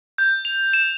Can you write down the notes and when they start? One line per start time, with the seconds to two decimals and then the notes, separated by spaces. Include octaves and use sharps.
0.18 G6
0.45 F7
0.73 E7